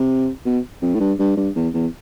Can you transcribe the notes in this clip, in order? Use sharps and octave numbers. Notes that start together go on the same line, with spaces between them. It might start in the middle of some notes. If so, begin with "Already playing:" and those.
Already playing: C3
B2
F2
A2
G2
G2
G2
E2
E2